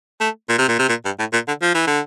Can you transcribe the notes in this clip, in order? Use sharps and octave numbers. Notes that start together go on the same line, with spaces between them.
A3
A#2
C3
A#2
C3
A#2
G2
A2
A#2
D3
F3
E3
D3